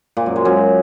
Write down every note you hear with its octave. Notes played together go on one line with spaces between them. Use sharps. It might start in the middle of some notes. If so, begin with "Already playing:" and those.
A#2
F#2
G#3
F#2